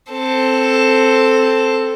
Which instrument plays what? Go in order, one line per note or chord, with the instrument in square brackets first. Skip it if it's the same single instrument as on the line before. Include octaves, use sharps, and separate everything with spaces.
[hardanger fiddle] C4 A4